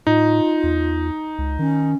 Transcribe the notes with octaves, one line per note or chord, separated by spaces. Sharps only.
A2 D#4 F4
E2
C#2
D#3 C#4